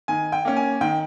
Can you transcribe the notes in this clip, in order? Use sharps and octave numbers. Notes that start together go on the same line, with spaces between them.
D#3 G#5
G5
A#3 C#4
G#5
D#3 G5